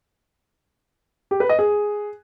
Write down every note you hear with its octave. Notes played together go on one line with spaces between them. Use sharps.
G4
B4
D#5
G#4